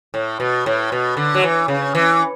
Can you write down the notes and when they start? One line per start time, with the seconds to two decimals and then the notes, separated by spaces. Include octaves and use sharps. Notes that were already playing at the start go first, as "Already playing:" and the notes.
0.14 A2
0.40 B2
0.66 A2
0.92 B2
1.17 D3
1.35 F#3
1.44 E3
1.68 C#3
1.95 E3